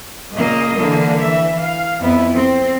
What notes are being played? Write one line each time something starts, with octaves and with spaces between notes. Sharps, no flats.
A#2 C#3 A#3 D#5
D3 E3 A#3
E3 E5
F5
F2 B3 E4
C4